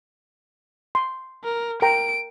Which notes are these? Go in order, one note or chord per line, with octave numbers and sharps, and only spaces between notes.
C6
A#4
A#4 G5 A#5 D7